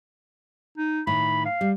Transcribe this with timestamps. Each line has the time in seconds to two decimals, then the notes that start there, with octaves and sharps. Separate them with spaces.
0.78 D#4
1.07 A2 D#3 B5
1.45 F5
1.61 G3